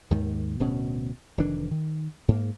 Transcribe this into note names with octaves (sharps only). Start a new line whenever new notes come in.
D#2 G#2 D#3
D1 B2 C#4
F1 D#3 E3 D4
D#3
G#2 A#3